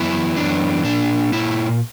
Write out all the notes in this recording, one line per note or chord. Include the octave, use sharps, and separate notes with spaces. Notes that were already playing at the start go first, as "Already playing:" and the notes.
Already playing: F#2 E3 B3 E4
F#2 E3 B3 D4
A#2 A#3 D4
A#2 A#3 E4